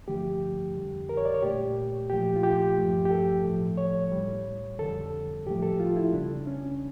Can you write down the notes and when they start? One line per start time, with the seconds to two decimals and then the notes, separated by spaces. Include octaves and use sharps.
0.08 G2 D3 F3 A3 G4
0.75 F2 D3 G3
1.09 A#4
1.17 C#5
1.25 D5
1.34 C#5
1.43 A#2 A3 G4
2.10 A#2 F3 A3 G4
2.36 F4
2.43 G4
2.77 G2 F3 A3
3.05 G4
3.11 A4
3.44 A2 F3 A3
3.78 C#5
4.12 A2 G3
4.78 F2 D3 G3 A4
5.46 A2 F3 A3 G4
5.62 A4
5.80 F4
5.96 E4
6.13 E2 C#3 G3 D4
6.47 C#4